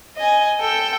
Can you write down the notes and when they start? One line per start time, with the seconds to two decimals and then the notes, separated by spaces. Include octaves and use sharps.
0.17 D#5 G#5
0.60 A4 G5